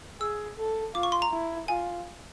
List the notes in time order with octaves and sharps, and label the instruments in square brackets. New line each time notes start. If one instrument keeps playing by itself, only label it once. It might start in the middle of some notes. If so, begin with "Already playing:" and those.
[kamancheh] G#4 [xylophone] E6
[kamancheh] A4
[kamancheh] F4 [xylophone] D6
[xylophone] C#6
C6
A#5
[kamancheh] E4
[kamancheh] F4 [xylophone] G#5